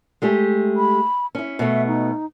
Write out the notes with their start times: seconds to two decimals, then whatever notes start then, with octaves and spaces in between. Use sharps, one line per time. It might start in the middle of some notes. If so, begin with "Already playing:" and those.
0.22 G#3 A3 G4
0.77 B5
1.35 C#4 E4
1.59 B2 A3 E5
1.87 D#4